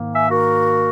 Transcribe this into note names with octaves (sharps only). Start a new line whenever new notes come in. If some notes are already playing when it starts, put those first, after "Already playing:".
Already playing: G#2 D#3 A#3
E5 G#5
F#4 A#4